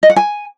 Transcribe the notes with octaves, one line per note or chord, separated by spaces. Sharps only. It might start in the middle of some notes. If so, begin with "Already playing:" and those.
D#5
F#5
G#5